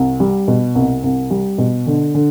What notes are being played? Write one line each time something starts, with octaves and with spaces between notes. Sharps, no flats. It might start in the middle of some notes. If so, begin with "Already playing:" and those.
Already playing: C2
G3
B2
C2
C2
G3
B2
D3
D3